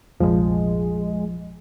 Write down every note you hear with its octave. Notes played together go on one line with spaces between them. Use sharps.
F1 A#1 F3 G#3